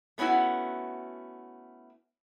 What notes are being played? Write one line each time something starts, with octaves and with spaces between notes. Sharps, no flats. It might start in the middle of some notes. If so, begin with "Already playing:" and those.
A3 B3 C#4 E4 F#4